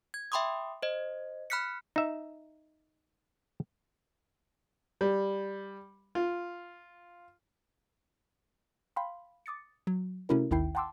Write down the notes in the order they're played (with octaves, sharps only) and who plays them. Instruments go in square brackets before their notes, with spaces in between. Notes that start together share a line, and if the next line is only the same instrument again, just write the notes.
[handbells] G#6
E5 G5 B5 C6 D6 D#6
C5 D#5
B5 F6 F#6 B6 C#7
[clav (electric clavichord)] D#4 E5
[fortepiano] G3
F4
[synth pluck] F5 G5 B5 C6
D6 D#6 A6 C#7
F#3
C3 A3 C#4 E4 F#4 A#4
A1 D#2 D#3 E4 G5 C7
F#5 G5 A5 C6 D6 E6